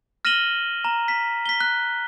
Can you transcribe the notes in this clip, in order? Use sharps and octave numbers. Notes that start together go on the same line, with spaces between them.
F6 A#6 D#7 E7 F#7 G7
A#5
B6
B6 G7
F#6